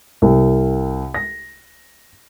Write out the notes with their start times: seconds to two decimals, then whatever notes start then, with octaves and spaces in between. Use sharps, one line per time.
0.22 C2
1.14 A#6